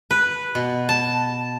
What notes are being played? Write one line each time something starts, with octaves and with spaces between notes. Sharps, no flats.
B4
B2
A5